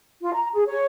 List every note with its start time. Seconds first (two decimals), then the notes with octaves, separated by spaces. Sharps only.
0.21 F4
0.33 A#5
0.54 G#4
0.67 C#5